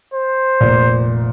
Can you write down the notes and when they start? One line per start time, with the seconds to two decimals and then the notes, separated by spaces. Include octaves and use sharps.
0.14 C5
0.61 F1 A#2